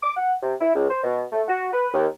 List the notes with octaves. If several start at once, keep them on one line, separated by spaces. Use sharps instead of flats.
D6
F#5
C3
E4
C#2
C5
B2
A3
F#4
B4
D#2